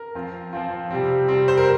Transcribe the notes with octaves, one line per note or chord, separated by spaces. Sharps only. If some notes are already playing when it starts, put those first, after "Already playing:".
Already playing: A#4
F3 C4 F4
F3 C4 F4
C3 G3 C4
C3 G3 C4
C5
A#4